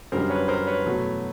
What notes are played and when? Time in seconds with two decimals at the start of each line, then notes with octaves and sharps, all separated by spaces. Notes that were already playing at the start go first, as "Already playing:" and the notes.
0.12 F#2 D3 G3 A#4 C5
0.30 B4 C#5
0.48 A#4 C5
0.67 B4 C#5
0.86 E2 B2 F#3 A3